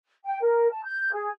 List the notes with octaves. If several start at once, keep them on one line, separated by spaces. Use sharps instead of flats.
G5
A#4
A5
G6
G#4